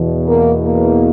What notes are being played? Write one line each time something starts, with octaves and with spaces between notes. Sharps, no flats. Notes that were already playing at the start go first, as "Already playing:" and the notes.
Already playing: E2 B2
A#3
A#3